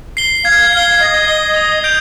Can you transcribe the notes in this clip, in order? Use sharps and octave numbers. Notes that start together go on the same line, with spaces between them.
C7 G7
F5 G#6
F5 C7 G7
D#5 G#6
C7 G7
D#6
G6 D7 F7